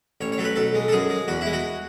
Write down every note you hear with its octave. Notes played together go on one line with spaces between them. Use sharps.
A1 C#5
C#5
F#3 A4
B4
B1 A4
G#3
A4
F#2 G#4
G#3
E2 F#4
G#3 E4
F#4